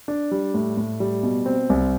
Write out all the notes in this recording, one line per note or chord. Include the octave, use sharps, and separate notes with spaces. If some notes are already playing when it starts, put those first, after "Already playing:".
D4
G3
A2
A2
G3
B2
C4
C2